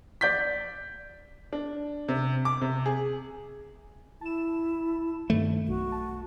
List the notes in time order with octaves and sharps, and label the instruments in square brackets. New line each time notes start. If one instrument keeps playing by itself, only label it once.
[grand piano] D5 G6 B6
[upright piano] D4
C3
D6
C3
G#4
[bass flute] E4 [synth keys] A5 E7
[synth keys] G2 D#3 [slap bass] A3
[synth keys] B1 [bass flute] F#4
[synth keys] A5